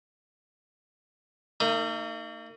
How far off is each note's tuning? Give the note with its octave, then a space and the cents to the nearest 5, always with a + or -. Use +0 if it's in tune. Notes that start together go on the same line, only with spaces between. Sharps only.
A#3 -45 D#4 +0